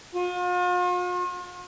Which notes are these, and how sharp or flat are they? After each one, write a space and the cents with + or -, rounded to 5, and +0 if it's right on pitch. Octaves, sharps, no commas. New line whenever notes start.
F4 +45